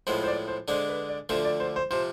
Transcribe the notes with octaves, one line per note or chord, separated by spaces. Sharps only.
A2 F3 G#3 B3 C5
C5
D5
C5
D3 G#3 D4 C5
B4
D5
D2 D3 F3 A3 C5
D5
C5
C5
C3 F3 C5